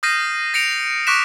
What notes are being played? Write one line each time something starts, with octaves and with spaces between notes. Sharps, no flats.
D#6 F6 G6 A#6 C7 D#7
A#6 C#7 D7 F7
C#6 D6 F#6 B6 D7 E7